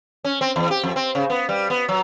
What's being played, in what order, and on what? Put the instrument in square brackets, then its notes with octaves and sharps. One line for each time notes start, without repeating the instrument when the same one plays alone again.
[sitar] C#4
C4
E2
G4
F2
C4
C#3
B3
G3
B3
F#3